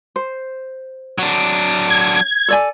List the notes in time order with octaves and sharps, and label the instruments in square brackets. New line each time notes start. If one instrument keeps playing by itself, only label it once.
[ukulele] C5
[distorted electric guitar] F#3 D4
[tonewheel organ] G#6
[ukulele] A4 D5 G#5